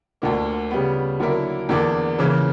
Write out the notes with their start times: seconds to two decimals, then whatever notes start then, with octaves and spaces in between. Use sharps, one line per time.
0.22 D2 D3 A#3
0.71 C#3 G3 B3
1.20 D3 F#3 A#3 E4 A#4
1.69 E2 D3 A#3 D4
2.19 C#3 E3 A#3